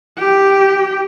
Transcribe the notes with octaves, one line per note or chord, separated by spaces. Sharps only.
G4 G5